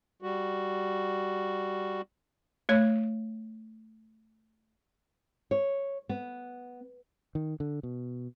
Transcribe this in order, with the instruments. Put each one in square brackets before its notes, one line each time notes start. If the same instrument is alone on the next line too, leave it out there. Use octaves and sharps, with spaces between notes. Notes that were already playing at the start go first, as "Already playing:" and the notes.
[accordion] G3 F#4
[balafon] A3 C#5
[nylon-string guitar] C#5
B3
[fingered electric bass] D#3
D3
B2